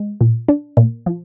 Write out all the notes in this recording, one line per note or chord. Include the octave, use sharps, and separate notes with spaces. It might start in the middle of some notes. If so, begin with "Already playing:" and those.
Already playing: G#3
A#2
D4
A#2
F3